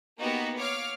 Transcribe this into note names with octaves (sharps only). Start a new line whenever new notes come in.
A#3 B3 D#4 F#4 G4
C#5 F5 D6 F6